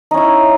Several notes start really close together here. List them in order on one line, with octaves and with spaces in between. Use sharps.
D#4 C#4 E4